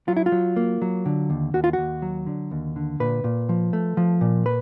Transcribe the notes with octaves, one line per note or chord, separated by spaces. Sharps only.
F#3 F4
E4
F4
F#3
A#3
F#3
D3
D#2
D#2 F#4
F4
D#2 F#4
F#3
D3
D#2
D3
A#2 B4
A#2
F3
A3
F3
A#2
B4